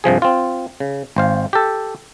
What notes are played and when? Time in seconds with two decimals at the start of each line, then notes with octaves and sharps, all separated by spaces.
0.04 G2 C3 F3 G#4
0.22 C4 F4
0.80 C#3
1.16 G#1 C5 F5
1.53 G4 A4